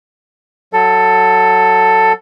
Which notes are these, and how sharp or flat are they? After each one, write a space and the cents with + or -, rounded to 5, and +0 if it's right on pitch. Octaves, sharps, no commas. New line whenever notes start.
F#3 +0 A4 +10